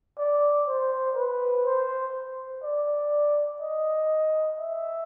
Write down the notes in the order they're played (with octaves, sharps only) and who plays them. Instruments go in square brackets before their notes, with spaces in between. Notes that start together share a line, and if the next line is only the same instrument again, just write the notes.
[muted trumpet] D5
C5
B4
C5
D5
D#5
E5